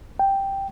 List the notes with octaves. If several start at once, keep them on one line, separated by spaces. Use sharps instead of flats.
G5